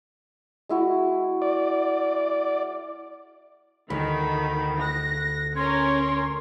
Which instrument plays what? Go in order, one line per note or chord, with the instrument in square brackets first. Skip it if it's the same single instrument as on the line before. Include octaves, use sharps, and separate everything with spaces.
[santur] G#3 E4 F#4
[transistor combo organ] D5
[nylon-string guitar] D2 [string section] D#3 [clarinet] B5
[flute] F#6 [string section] A#6
[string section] C#4 A#4 [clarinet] C#5 [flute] C6